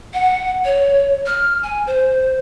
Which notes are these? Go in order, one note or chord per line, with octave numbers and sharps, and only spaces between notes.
F#5
C#5
F6
G#5
C5